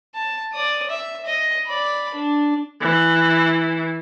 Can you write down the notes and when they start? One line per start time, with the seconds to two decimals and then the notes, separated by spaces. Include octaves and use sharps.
0.15 A5
0.53 D5 D#6
0.90 E5
1.25 D#5
1.67 D5 B5
2.15 D4
2.81 E3